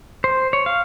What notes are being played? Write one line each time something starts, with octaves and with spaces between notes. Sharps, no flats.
C5
C#5
F5